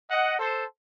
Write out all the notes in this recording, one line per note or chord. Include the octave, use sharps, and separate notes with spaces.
D#5 F#5
A4 C5